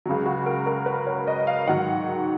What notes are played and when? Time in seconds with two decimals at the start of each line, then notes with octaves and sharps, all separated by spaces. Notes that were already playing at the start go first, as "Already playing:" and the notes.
0.06 C#2 C#3 F#3
0.26 F#4
0.46 A#4
0.67 A#4
0.86 B4
1.07 C#5
1.27 D#5
1.47 F5
1.66 G#2 D#3 F#3 F#5